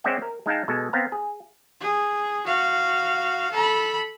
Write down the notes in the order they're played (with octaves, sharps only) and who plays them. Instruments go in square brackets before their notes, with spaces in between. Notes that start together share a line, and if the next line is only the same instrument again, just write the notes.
[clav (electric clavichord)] G#3 C4 C#4 D5 E5 F#5
A#4
G#3 D#4 F5 G5 A5
B2 G#3 A4
B3 C4 F5 A#5
G#4
[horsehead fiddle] G#4
F#4 F5
A4 B5